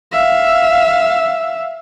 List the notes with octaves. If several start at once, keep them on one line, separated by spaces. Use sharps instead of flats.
E5 F5